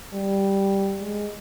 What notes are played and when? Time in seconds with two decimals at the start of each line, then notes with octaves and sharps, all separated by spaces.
0.13 G3
1.00 G#3